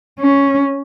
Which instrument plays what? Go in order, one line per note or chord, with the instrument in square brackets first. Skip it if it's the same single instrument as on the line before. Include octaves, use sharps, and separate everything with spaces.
[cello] C#4